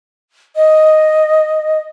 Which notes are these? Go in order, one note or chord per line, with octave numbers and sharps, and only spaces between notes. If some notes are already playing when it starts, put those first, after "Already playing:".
D#5